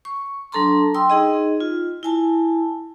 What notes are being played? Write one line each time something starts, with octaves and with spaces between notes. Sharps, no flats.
C#6
F#3 D4 A4 A5 A#5 C6
G5 C6 D#6 E6
D#4 G#4 D#5
F4
E4 G#5 A5